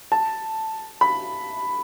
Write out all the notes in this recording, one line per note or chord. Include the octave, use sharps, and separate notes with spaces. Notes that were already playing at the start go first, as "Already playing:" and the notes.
A5
B5